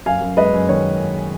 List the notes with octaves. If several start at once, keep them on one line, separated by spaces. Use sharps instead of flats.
F#2 F5 G#5
F#2
G#3 B4 D#5
F#2
D#3 C#5